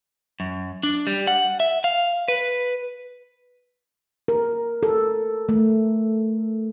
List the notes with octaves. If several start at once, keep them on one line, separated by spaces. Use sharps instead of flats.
F#2
D4
G3
F#5
E5
F5
B4
A#4
A4
A3